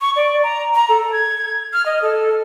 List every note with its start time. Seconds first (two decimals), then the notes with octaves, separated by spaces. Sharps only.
0.01 C#6
0.16 D5
0.43 A#5
0.75 A#5
0.89 A4
1.12 G#6
1.73 F6
1.86 D#5
2.02 A4